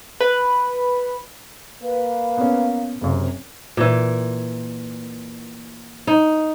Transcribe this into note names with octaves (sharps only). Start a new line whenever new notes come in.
B4
A#3 B4
B3 C#4
F#1 F#2 C3
A#2 E3
D#4